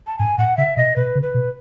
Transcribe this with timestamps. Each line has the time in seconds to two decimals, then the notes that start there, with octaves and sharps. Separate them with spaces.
0.07 A5
0.18 G#2 G#5
0.38 A2 F#5
0.57 C#3 E5
0.77 B2 D#5
0.96 B2 B4
1.15 C#3
1.22 B4
1.34 B2